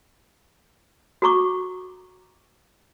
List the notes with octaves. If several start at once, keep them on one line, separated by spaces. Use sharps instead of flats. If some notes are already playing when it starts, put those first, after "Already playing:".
F#4 A4 A#5 C#6 D6